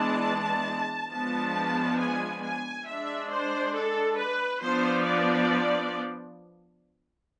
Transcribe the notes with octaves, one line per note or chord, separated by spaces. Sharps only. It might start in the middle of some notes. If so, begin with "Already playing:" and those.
Already playing: E3 G#3 B3 D4 A5
F3 G#3 B3 D4 A5
G#5
G#5
G#3 D4 E5
C5
A4
B4
F3 B3 D4 C5
D5